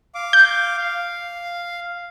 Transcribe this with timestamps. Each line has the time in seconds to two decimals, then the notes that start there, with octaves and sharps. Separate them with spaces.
0.15 F5 D6
0.33 G6
0.77 F5